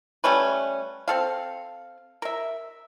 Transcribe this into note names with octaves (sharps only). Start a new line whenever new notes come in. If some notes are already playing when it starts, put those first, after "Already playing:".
G3 A3 C#4 B4
C4 A4 F5
A#4 E5